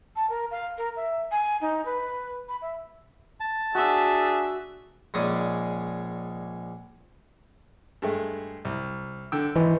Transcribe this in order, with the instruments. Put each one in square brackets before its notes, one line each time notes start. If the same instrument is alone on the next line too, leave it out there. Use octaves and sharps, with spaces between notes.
[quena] A5
A#4
F5
A#4
E5
G#5
D#4
B4
B5
E5
[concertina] A5
[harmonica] D4 G#4 E5 [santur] F#4 E6
[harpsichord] A#1 G#3 C#4 D#4 G#4 D5
[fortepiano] G2 G#3 A3
C2
D3 G5 E6
[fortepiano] G#1 [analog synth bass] E3